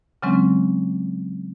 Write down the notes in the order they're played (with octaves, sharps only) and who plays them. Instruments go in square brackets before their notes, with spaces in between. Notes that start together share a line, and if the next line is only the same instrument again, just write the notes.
[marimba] C#3 E3 F#3 G#3 C4 C#4